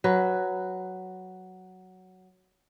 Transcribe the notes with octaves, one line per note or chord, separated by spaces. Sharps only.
F#3 B4